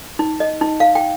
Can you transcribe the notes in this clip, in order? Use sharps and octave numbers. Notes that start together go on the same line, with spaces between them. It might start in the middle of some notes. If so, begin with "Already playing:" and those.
D#4
D#5
D#4
F5
G5